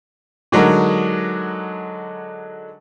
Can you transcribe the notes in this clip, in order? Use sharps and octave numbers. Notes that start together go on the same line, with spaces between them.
D3 F#3 G#3 D#4 A#4